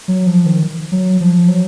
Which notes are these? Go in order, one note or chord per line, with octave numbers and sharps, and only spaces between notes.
F#3
F3
D#3
F#3
F3
F#3